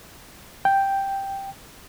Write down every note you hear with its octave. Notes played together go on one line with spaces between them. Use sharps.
G5